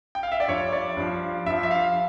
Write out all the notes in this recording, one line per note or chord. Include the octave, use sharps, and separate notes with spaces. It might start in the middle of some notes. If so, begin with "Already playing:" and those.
G5
F5
E5
D5
G2 F3 C#5
D5
G2 F3
G2 F3 E5
E5
F5